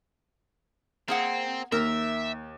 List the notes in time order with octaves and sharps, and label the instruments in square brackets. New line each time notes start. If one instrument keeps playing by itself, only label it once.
[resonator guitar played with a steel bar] A#3 G#4 F#5 [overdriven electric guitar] C4
[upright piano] D#2 [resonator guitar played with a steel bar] A#4 [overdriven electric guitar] E5